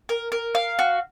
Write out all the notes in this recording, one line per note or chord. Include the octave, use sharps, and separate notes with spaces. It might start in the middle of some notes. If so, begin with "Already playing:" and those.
A#4
A#4
F5
F#4